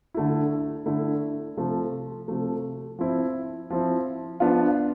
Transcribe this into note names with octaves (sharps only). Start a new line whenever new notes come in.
D3 A3 E4
D3 A3 E4
C3 F3 A3
C3 F3 A3
F3 C4 E4
F3 C4 E4
F3 B3 D4 F4